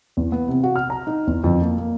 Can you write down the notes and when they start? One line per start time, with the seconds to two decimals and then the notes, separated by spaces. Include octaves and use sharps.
0.17 E2
0.32 B3
0.48 C3
0.63 F#4
0.76 F6
0.90 A#5
1.07 D#4
1.27 E2
1.44 F2
1.61 A#3
1.78 A#3